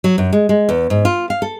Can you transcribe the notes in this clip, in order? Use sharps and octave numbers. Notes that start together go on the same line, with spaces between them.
F#3
F#2
G#3
G#3
E2
G#2
F4
F5
A4